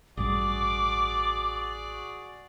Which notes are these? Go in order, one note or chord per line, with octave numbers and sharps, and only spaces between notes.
A1 G2 G3 F#4 G#4 D5 D6